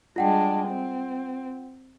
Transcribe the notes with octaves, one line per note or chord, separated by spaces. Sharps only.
G3 G#3 D4 F4 F#5 G5
C4